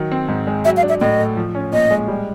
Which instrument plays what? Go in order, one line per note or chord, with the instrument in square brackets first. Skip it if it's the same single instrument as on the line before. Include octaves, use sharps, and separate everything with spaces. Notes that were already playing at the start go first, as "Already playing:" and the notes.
Already playing: [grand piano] D#3 F#3
C4
G#2
G#3
[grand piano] F#3 [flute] E5
[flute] F5
[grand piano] D4
[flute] E5
[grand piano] A2 [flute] D#5
[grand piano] A3
F3
C#4
[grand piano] A#2 [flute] D#5
[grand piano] G#3
G3